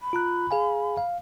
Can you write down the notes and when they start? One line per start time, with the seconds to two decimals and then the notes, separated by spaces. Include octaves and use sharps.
0.01 B5
0.13 F4 A#5 F#6
0.51 G#4 F5 G#5
0.97 F5